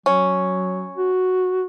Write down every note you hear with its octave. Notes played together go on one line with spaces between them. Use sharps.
F#3 C#4
F#4